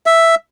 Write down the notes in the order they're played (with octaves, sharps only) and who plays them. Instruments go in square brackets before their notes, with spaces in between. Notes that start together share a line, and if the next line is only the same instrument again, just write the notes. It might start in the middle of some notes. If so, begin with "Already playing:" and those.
[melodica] E5